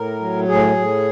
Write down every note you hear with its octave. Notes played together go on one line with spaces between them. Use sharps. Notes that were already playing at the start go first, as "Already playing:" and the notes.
Already playing: A2 A#4
F#3
A2 G#4
A2